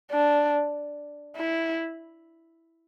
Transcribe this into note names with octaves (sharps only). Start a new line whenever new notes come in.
D4
E4